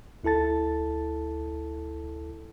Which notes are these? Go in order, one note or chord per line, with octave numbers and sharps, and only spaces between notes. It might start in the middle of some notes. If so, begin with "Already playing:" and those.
D2 E4 A4 A5 A6